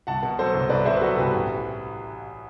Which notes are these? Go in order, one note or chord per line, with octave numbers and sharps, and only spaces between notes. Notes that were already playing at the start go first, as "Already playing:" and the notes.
C2 F#5 A5
B2
F#3 A4 C5
C2
C2 B4 D5
B2 C5 E5
B4
F#3 F#4 A4
C2 G4 B4
A1